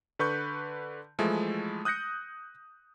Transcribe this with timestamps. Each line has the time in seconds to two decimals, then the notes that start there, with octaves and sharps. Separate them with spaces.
0.19 D3 B4 C#6 G6
1.19 E3 F3 G#3 A3 E4
1.85 D#6 F#6 G6 A#6 C#7